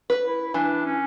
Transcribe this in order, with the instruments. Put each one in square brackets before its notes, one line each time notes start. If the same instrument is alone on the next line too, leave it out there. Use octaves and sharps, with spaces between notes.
[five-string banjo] B4
[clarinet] E4
[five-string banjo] E3 [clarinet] D4
[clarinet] C#4